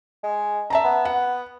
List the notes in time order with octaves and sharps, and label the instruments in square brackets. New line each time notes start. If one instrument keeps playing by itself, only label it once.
[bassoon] G#3
[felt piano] E5 A5 A#5
[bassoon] B3
[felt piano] F#5